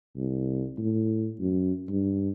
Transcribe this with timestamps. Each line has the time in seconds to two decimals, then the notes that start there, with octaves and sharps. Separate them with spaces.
0.16 C2
0.78 A2
1.40 F#2
1.89 G2